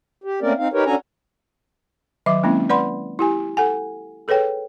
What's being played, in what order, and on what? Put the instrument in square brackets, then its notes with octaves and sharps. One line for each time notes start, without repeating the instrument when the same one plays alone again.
[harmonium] G4
A3 A#3 C4 C#4 A#4 D5
C4 D#4 F5
D#4 G4 A#4 B4 C#5
C#4 D4 F#4 A4 G#5 A#5
[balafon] D#3 F#3 E5 D6
G#3 A#3 C4 C#4 E4
B4 D5 F#5 B5 C6
E4 G4 G#5
A4 F#5 G#5
G#4 A4 B4 C#5 G5